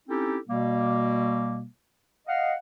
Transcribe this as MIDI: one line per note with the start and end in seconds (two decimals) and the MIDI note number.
0.08 0.37 60
0.08 0.37 61
0.08 0.37 63
0.08 0.37 64
0.08 0.37 67
0.08 0.37 69
0.47 1.65 47
0.47 1.65 55
0.47 1.65 58
2.27 2.54 75
2.27 2.54 77
2.27 2.54 78